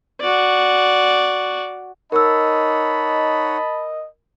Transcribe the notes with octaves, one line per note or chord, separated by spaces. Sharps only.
F#4 D5
D#4 A#4 C#5 D#5 F#5 A5 B5 E6